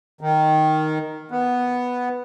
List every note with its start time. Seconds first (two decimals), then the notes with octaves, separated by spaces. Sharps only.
0.21 D#3
1.31 B3